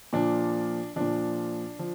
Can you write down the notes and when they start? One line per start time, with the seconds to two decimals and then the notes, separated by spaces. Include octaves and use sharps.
0.13 A#2 F3 D4
0.96 A#2 F3 D4
1.79 F3